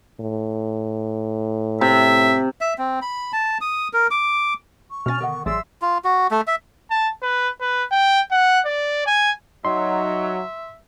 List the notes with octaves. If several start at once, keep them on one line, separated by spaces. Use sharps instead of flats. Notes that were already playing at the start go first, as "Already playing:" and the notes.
A2
C3 E5
E5
C4
B5
A5
D#6
A#4
D6
C#6
B2 C#4 C#5 G#5 F6 A6
D3 D#3 B3 A#4 D#5 F#5
A1 F#3 G#4 D5 E5 C6 E6
F4
F#4
A3
E5
A5
B4
B4
G5
F#5
D5
G#5
F#3 D#4 E5 C6